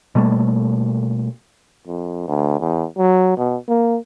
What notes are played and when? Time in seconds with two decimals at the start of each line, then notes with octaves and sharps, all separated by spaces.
0.15 B2 G3 A3 A#3
1.87 F2
2.28 D2
2.59 E2
2.98 F#3
3.38 B2
3.68 A#3